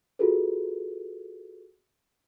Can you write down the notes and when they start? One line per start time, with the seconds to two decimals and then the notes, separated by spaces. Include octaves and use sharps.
0.19 F4 F#4 G#4 A4 B4